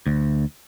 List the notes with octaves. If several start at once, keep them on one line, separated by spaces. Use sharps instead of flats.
D2